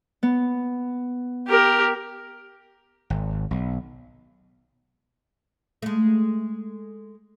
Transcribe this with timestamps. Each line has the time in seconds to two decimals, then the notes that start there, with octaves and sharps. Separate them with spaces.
0.23 B3
1.48 G4 A#4
3.10 G#1
3.51 B1
5.82 G#3 A3